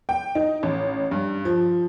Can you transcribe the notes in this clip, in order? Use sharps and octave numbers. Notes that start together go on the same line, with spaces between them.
G5
D#4
A1
G2
F3